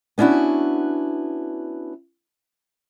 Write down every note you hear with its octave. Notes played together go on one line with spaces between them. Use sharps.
B3 C#4 D4 E4 F#4